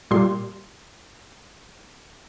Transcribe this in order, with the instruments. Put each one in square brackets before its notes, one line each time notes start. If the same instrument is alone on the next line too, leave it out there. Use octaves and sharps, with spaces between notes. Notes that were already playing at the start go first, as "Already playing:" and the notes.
[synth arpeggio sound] A#2 G3 C6